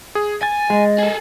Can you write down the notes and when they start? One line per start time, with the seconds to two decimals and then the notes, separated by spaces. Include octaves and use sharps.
0.15 G#4
0.43 G#5 A6
0.70 G#3 D#5
0.98 G#4 A4